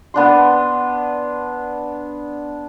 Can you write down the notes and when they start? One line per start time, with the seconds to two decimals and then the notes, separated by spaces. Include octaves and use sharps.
0.14 B3 D4 C6